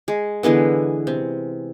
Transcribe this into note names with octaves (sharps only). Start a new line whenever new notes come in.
G#3
D3 E3 G#3 B3
C3